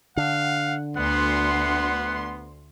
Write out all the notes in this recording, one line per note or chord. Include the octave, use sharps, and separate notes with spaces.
D3 F5 F#5
D2 B3 F#5 C6